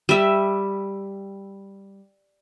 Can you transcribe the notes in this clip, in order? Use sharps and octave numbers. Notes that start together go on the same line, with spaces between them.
G3 E5